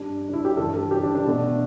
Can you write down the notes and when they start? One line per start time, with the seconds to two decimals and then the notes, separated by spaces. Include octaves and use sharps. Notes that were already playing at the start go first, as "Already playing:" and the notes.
Already playing: G2 G3 D4
0.29 D4
0.33 E4
0.45 G4
0.57 G2 E3 G3 A4
0.75 A4
0.91 G4
1.03 D4
1.15 D4
1.26 B2 A3